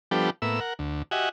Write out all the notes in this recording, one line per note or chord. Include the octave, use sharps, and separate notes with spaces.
F3 G3 B3 D4 G4 A4
A2 A#3 B3 E5 E6
A#4 F#5
D2
F#4 G4 D#5 E5 F#5 G#5